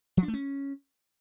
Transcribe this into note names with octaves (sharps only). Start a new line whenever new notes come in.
F3
D4
A3
C#4